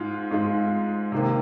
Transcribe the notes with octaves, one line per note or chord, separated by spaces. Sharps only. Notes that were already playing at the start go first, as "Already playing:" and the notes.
Already playing: G#2 G#3 F4
G#2 G#3 F4
C3 D#3 A#3